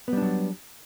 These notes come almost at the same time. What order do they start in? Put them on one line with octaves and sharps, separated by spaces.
B3 G3 D4 F#3